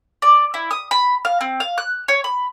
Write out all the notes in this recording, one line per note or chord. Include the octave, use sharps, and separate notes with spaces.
D5
E4
D#6
B5
F5
C4
F5
F#6
C#5
B5